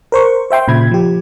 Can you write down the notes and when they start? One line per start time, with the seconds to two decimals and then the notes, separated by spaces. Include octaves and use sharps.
0.12 A#4 C5 C#6
0.51 C5 E5 G5 C6
0.68 A#2 C#3 B5 G#6
0.91 F3 G4